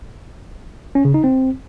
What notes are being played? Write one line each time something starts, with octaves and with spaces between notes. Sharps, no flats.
C#4
C#3
D#4
C4